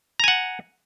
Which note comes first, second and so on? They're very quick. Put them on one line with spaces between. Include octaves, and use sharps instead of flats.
A#5 G#5 F#5